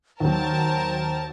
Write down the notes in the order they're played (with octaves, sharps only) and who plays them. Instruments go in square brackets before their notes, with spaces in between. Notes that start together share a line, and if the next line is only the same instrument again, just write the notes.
[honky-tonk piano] D#2 F#3 [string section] A#4 A5 [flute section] C5 G5